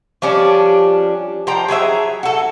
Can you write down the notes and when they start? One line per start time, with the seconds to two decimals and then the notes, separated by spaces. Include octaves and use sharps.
0.22 F3 G3 C#4 D4
1.47 F3 C5 G5 A#5
1.68 F#3 G#4 B4 E5
2.23 F#4 A4